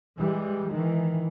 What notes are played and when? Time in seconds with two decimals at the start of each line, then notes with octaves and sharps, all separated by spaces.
0.17 E3 G3 G#3
0.69 D#3 E3